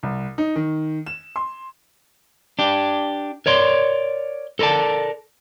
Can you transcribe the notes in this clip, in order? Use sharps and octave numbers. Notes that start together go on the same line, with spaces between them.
C2
D#4
D#3
E7
C6
D4 G4
A#4 C#5 D5 C6
A4 A#4 C5 D5 A5